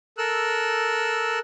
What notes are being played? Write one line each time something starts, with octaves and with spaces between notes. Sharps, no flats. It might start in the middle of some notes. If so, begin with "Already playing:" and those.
A4 A#4 E6 F#6